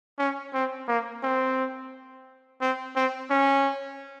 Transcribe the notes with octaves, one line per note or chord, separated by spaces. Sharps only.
C#4
C4
A#3
C4
C4
C4
C#4